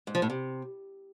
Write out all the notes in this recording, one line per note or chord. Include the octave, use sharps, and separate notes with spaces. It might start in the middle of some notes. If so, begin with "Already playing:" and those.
G#2
F3
A2
C3